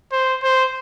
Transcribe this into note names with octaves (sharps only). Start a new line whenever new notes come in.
C5
C5